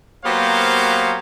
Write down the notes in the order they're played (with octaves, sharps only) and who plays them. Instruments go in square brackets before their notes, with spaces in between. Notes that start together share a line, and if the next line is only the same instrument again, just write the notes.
[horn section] F#3 A#3 B3 G4 C5 F5